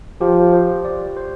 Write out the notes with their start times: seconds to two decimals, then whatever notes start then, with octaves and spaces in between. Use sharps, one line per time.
0.21 F3 G4
0.53 C5
0.85 D5
1.17 C5